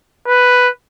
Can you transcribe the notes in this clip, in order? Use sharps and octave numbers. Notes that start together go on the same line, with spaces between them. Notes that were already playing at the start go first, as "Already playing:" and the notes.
B4